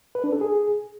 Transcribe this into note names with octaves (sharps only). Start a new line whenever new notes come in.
B4
D4
A4
G#4